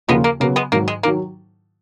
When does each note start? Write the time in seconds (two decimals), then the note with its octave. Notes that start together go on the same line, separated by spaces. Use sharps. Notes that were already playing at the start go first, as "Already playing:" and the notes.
0.08 D#2 C#3 F3 G#3 A#3 B3 F4
0.24 A#3
0.40 C#3 F#3 A#3 B3
0.56 G#3 B3
0.72 G#2 D#3 F#3 A#3
0.88 G#3
1.03 D#3 F#3 A#3